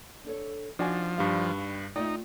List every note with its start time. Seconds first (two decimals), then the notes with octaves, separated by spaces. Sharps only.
0.24 D4 A4 C#5
0.79 F3 D4 D#4 F#4 G#5
1.18 G2 G3 F5
1.96 A3 D#4 F4 D5 G5